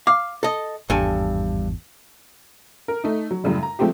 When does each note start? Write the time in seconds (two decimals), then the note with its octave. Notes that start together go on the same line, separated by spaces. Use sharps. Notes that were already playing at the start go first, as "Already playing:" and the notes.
0.07 F5 D6
0.43 A4 D#5
0.90 G#1 E2 G2 A4 G#5
2.88 A#4
3.04 A3 D#4
3.31 F#3
3.44 F#2 A2 C#3 G3
3.63 A#5
3.79 F3 G#3 A3 C4 G4